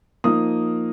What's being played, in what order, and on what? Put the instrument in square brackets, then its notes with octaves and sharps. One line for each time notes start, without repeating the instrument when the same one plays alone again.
[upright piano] F3 A#3 D#4 D#6